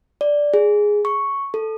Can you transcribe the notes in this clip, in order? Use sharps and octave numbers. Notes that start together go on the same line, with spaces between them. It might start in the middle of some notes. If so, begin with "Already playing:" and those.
D5
G#4
C#6
A4